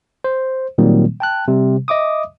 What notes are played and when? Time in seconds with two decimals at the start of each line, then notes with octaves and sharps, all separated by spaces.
0.24 C5
0.78 A#2 D#3 F#3 G3 A#3 C4
1.20 G5 A5 F#6
1.48 C3 G3
1.88 D#5 E5 D6 D#6